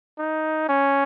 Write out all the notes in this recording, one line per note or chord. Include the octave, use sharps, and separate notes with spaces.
D#4
C#4